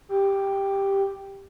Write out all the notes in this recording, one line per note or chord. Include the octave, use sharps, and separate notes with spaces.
G4